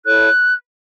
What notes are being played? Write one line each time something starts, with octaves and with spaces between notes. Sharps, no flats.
E4 A4 C#5 F#6